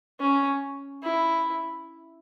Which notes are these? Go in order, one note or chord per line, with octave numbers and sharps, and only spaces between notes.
C#4
E4